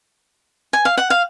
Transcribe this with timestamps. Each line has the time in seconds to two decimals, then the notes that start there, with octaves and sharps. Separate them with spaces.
0.73 G#5
0.85 F5
0.98 F#5
1.10 F5